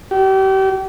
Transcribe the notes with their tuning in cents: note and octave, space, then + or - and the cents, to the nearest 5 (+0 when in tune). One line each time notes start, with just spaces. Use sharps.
G4 -35